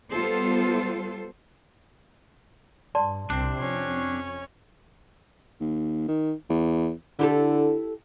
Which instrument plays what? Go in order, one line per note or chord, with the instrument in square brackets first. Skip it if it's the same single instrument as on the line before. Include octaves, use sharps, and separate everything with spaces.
[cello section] G3 B3 F4 A4 C5
[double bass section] G2 [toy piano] D5 A5 C6
[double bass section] C2 C3 [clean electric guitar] C4 D4
[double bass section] F2 [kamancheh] C#4 C#5
[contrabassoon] D#2
D#3
E2
[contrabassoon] D3 [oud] E4 G4 A4